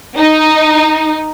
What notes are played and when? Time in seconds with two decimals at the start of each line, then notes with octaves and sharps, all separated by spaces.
0.17 D#4